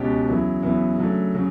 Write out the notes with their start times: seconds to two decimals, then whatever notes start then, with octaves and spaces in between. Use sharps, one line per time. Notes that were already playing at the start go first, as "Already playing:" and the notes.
Already playing: C#2 B2 C#4 G4
0.27 E2 C#3 F#3 B3 E4
0.63 E2 C#3 F#3 B3 E4
0.98 C#3 F#3 A3 D4
1.35 C#3 F#3